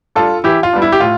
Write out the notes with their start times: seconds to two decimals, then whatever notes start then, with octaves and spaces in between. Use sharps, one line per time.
0.16 G3 D4 F4 A4
0.44 E3 E4 G4
0.63 F4
0.73 G3 B3 D4
0.82 E4
0.92 G4
1.00 A2 F4